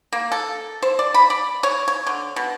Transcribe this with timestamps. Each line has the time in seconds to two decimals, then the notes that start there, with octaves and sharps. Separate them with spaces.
0.13 A#3
0.32 A4
0.82 C5
0.99 D5
1.14 B5
1.30 D5
1.63 C#5
1.88 C#5
2.07 D3
2.36 B2